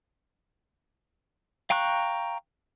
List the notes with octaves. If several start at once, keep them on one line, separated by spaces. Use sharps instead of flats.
F5 G5 A#5 C#6 F#6